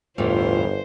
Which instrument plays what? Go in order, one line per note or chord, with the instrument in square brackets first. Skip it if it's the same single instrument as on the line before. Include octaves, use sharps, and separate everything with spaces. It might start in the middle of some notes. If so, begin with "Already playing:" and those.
[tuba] G1 [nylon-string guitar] E2 A2 E3 [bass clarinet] F4 [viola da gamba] C5